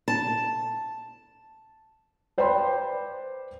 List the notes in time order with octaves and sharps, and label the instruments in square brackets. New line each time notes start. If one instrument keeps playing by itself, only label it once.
[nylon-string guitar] A5
[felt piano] B4 C5 D5 G5 B5 C6